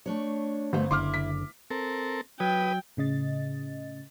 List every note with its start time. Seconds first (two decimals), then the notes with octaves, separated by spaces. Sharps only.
0.06 A3 D4 C#5
0.73 G1 A3 B3 C5
0.91 F#1 D3 E4 C6 D6 F6
1.14 B6
1.71 C4 A4 A#4
2.40 F#3 B4 G5 D#6
2.97 A2 C#3 D#5 A6